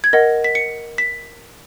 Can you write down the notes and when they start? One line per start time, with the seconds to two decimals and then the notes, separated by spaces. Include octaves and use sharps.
0.04 G#6
0.13 A#4 D#5 F#5 A#6
0.44 B6
0.55 C#7
0.98 B6